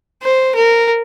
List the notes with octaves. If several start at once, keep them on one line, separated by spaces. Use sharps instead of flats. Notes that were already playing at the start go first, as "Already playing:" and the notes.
C5
A#4